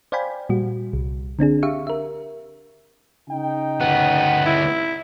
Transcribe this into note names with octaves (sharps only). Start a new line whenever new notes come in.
C5 D5 F5 G5 G#5 B5
A#2 G3 F#4
C2
D3 C4 D4 G#4
G4 E5 F5 C#6
A#4 E5
C#3 D#4 G5
D2 B3 F#5
E4